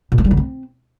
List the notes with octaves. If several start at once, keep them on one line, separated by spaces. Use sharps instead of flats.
A#2
A3
G3
D3
C4